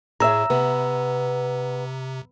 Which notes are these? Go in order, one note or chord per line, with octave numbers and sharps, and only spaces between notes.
A2 G#4 C#5 E5 A#5 E6
C3 B3